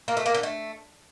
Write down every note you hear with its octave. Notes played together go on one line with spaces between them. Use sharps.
A#3
A3
A#3
D3
A3